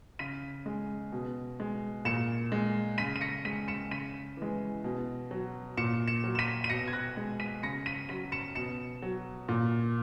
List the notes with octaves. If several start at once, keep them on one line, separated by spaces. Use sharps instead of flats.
C#3 B6 D#7
G#3
B2
G#3
A#2 C#7 E7
G#3
C#3 B6 D#7
D#7
A#6 C#7
G#3 B6 D#7
C#7 E7
C#3 B6 D#7
E3 G#3
B2
F#3
A#2 C#7 E7
C#7 E7
F#3
E7
B6 D#7
D#7
B2 A#6 C#7
G#6
F#6 A#6
G#3
B6 D#7
C#3 A#6 C#7
B6 D#7
F#3 B6 D#7
C#7 E7
B2 C#7 E7
F#3
A#2